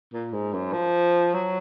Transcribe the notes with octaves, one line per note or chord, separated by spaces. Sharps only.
A#2
G#2
F#2
F3
F#3